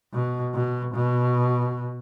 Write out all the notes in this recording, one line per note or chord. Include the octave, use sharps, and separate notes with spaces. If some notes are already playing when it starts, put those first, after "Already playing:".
B2
B2
B2